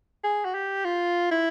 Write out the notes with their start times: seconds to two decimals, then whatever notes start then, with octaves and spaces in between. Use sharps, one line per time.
0.24 G#4
0.45 F#4
0.54 G4
0.84 F4
1.31 E4